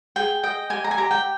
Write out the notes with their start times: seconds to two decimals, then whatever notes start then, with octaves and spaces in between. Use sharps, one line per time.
0.16 G#4 G5
0.43 D#5 G5
0.70 G4 G#5
0.84 A#5
0.91 G#5
0.97 G4 A#5
1.11 G5